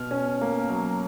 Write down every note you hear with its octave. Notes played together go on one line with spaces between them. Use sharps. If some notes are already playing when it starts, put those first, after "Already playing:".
Already playing: B2 F6
C#4
A#3
F#3